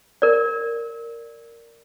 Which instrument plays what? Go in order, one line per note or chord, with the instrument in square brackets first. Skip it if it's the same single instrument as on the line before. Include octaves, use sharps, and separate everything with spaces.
[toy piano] A#4 D5